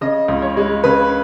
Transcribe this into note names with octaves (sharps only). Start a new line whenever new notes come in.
C#3 D#5
C#2
C#5
G#3
C#3 B4